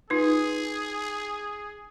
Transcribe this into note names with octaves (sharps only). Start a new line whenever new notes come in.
D#4 F4 G#4 B4